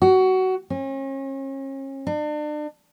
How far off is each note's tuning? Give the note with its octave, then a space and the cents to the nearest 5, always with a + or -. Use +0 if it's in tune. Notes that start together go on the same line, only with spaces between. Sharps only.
F#4 +20
C#4 -40
D4 +35